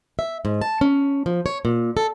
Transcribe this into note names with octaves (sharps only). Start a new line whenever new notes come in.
E5
G#2
A5
C#4
F3
C#5
A#2
A4